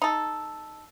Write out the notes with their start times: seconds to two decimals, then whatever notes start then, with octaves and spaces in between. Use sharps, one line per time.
0.02 D#4 A4